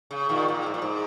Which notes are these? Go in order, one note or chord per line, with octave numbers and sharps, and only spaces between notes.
C#3
A#2 D#3
A#2
G#2
A#2
G#2